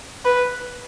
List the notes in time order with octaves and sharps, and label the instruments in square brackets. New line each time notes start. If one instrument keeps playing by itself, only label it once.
[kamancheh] B4